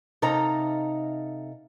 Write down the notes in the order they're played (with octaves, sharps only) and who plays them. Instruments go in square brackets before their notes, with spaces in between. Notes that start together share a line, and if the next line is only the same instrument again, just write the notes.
[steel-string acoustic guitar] C3 D#4 A4 F5 A#5